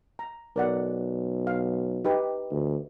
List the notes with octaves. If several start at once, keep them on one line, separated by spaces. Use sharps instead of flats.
A#5
B1 A#4 D5 F#5
F5
D#4 G4 B4
D2